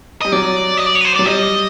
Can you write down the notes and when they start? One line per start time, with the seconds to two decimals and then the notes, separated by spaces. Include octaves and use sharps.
0.22 G3 D#5
0.32 F#3 D5
0.77 D#5
0.86 D5
0.95 C#5
1.01 B4
1.05 C5
1.16 F#3 D5
1.26 G3 D#5